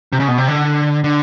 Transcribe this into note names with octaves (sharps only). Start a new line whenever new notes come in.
C3
C#3
B2
C3
D3
D3